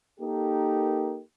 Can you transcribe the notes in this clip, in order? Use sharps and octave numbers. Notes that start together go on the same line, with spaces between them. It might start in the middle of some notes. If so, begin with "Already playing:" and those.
A#3 D#4 G4 A4 A#4